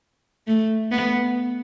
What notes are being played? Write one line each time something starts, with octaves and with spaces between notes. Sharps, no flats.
A3
B3